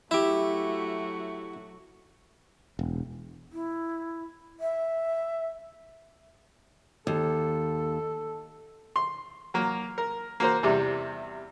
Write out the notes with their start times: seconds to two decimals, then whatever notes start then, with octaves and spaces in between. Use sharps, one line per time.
0.11 F#3 A3 E4 F#4 G4 E5
2.79 E1
3.52 E4
4.60 E5
7.07 D#2 A4
8.96 C6
9.54 F#3 A#3
9.98 A#4
10.40 A#3 F#4 A#4 C5
10.63 E2 C3 G3